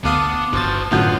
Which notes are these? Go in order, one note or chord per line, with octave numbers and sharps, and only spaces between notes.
D2 B3 D4 F5 D#6
G1 F3 F#4 A5 A6
F#2 A2 D3 B3 F4 F#4 G6